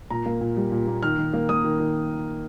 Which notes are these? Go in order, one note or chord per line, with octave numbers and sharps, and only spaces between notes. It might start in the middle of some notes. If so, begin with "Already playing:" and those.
A#2 A#5
A#3
A#2
G3
A#2
A#3
D#3 F6
D#3
A#3
A#3 D#6
D#3
D#3